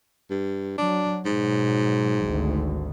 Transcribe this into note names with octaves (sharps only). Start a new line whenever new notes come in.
G2
F#3 D4
G#2 B2 F#3
G#1 D2